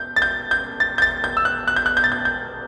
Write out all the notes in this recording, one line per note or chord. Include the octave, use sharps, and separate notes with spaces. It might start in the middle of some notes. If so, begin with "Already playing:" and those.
Already playing: G6
A6
G6
G6
A6
G6
A6
G6
E6
F#6
F#6
G6
F#6
G6
A6
G6
G6